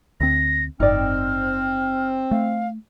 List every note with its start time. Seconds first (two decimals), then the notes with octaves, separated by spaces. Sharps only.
0.21 D2 C4 A#6
0.80 F#1 G#2 C4 D#4 D5 F6
2.31 A3 F5